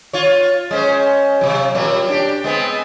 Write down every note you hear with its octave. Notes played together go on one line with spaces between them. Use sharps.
F4 C#5
G#3 C#4 C5
C3 F#3
A#2 F#3 G3
D4 G4
G#3 B3 C4